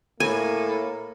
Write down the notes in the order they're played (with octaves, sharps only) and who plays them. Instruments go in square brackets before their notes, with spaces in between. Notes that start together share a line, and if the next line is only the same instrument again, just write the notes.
[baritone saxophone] A2 [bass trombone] A#3 [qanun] G#5